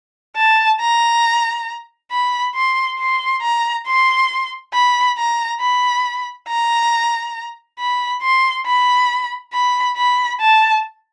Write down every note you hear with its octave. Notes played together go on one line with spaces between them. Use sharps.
A5
A#5
B5
C6
C6
A#5
C6
B5
A#5
B5
A#5
B5
C6
B5
B5
B5
A5